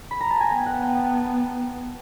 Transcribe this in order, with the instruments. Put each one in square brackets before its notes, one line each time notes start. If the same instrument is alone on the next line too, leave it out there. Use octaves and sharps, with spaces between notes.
[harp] B5
A#5
A5
G#5
[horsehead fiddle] B3 [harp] G5
[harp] F#5
G5
A5
A5